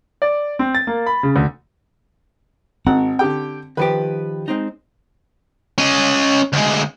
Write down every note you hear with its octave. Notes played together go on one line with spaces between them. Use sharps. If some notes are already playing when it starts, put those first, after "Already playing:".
D5
C4
A6
A#3
B5
C#3
D2
G#1 C4 F#5
D3 G4 G5
D#3 F3 G4 B4
G#3 C4 D#4
C#4 D#5
D2 G#3